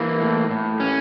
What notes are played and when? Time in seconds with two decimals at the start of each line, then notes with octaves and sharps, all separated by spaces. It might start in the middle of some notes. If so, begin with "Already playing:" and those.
Already playing: E3 A#3
0.21 A2
0.51 A2
0.80 C#4